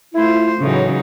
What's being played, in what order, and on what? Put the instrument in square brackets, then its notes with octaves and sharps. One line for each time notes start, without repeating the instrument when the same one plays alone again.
[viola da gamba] A3 F4 C5 [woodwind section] E4
[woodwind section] A2 [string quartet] C#3 [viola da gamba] E3 F#3 D#4